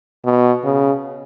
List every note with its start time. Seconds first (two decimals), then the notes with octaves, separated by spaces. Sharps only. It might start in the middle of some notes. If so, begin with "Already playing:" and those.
0.25 B2
0.64 C#3